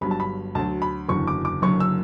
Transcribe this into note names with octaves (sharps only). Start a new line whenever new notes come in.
G1 G2 F#3 B5
A5
B5
D2 D3 F#3 A5
B5
F#1 E2 D3 F#3 C#6
D6
D6
F#1 F#2 D3 F#3 C#6
E6